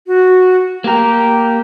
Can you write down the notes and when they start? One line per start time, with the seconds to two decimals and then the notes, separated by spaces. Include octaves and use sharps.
0.07 F#4
0.84 A#3 G4 A#4